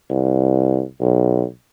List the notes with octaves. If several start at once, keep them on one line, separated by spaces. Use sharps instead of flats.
C2
B1